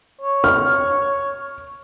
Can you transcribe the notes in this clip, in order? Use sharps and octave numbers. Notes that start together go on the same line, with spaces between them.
C#5
F6